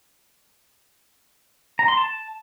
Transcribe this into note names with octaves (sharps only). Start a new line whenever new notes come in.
A#5
C6
A5